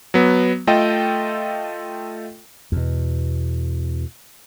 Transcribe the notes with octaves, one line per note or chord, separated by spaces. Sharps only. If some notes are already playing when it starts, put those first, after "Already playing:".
F#3 B3
A3 F4 A4 D#5 G5
E2 B2